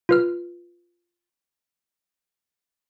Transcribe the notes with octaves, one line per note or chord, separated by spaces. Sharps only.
F4 B4 F6